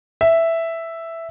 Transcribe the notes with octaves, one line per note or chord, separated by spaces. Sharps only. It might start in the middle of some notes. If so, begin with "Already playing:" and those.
E5